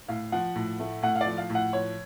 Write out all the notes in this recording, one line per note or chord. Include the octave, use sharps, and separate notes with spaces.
A2 F5
F3 F#5
A2
A3
A2 F#5
F5
D5
F3
F5
A2
F#5
F3 C#5